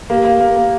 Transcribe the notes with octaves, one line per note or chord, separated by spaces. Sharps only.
A#3 G4
A#3
A#3
A#3